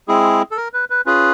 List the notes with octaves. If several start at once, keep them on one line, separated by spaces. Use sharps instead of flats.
G#3 C4 E4 G#4
A4
A#4
B4
B4
C#4 F4 G#4 B4